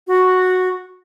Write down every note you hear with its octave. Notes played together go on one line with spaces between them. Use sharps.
F#4